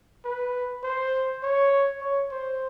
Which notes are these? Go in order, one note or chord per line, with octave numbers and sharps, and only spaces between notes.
B4
C5
C#5
C#5
C5